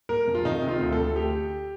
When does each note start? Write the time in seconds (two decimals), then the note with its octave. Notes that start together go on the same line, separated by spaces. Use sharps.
0.09 A#3 A#4
0.27 F2
0.35 F4
0.45 D#3 D#4
0.62 C3
0.68 F4
0.80 D2
0.93 A4
0.98 D2
1.16 G4